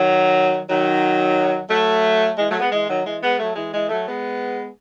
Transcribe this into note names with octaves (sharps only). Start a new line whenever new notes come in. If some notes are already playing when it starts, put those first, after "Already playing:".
Already playing: D#3 F#3
D#3 F#3
F#3 A3
E3 G#3
F#3 A3
G#3 B3
E3 G#3
D#3 F#3
E3 G#3
G#3 B3
F#3 A3
E3 G#3
E3 G#3
F#3 A3
G#3 B3